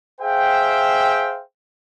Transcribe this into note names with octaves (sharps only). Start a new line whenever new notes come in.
G#4 C5 E5 F5 G5